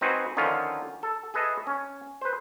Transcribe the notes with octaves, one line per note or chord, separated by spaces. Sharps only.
C4 D#4 F#4 B4 C5 G#5
D3 D#3 F3 C#4 F4
A4
G#4 A4 B4 D#5 E5
C#4
B4 C5